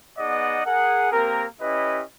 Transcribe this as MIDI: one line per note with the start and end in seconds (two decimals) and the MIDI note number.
0.18 0.61 59
0.18 0.61 63
0.18 0.61 68
0.18 0.61 74
0.18 0.61 75
0.18 0.61 78
0.65 1.11 68
0.65 1.11 70
0.65 1.11 78
1.12 1.46 58
1.12 1.46 60
1.12 1.46 67
1.12 1.46 70
1.61 2.03 61
1.61 2.03 64
1.61 2.03 67
1.61 2.03 71
1.61 2.03 75